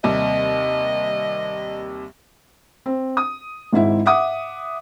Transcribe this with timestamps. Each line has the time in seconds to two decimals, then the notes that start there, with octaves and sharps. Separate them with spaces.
0.04 D#2 C3 G3 D#5
2.86 C4
3.17 D#6
3.72 G#1 G#2 E4 E5
4.06 E5 F#5 D6 D#6